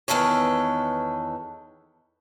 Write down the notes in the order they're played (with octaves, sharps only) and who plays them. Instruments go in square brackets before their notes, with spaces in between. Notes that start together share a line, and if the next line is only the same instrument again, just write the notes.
[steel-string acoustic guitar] E2 D#3 A4 B4 C#5